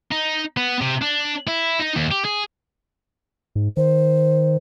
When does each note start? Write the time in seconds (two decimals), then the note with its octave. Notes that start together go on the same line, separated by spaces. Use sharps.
0.12 D#4
0.57 B3
0.81 C3
1.02 D4
1.47 E4
1.80 D#4
1.96 D#2
2.11 G4
2.25 G#4
3.55 G#2
3.77 D#3 C5